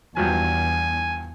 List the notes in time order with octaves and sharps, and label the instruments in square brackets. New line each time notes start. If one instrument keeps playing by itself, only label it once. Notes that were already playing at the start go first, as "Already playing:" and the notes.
[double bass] E2 [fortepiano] G2 F3 F#3 [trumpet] G#5